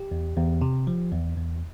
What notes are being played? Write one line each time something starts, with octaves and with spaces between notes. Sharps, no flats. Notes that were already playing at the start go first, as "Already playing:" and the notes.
Already playing: G4
E2
E2
C3
F3
E2
E2